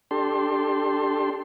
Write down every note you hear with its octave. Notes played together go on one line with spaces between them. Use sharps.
D4 G4 A4 C6